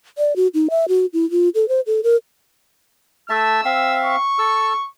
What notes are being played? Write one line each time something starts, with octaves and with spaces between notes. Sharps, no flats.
D5
F#4
D#4
E5
F#4
E4
F4
A4
C5
A4
A#4
A3 E5 A5 E6
C4 E5 F5
C#6
A4 E6